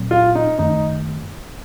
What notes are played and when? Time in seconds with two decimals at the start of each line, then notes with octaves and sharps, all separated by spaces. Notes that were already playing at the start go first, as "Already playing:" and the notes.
Already playing: A#2 F#3 C4
0.11 F4
0.35 D#4
0.59 F#2 D#3 A3 D#4